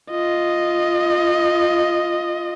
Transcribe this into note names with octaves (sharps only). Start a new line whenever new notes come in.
F4 D#5